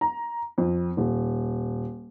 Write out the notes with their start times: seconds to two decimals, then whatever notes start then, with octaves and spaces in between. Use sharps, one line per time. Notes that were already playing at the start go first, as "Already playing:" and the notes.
0.01 A#5
0.58 F2
0.97 D#1